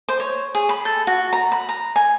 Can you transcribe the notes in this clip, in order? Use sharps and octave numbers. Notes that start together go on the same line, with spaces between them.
C5
C#5
G#4
B5
A4
F#4
A#5
B5
A#5
G#5